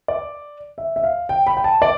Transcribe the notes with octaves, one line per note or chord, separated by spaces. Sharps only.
D5
E5
E5
F5
G5
B5
G5
A5
D5